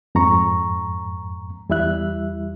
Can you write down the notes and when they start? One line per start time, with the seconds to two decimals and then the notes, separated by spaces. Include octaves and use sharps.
0.15 F2 G#2 A#5 C#6
1.69 E2 G3 E4 E5 F#6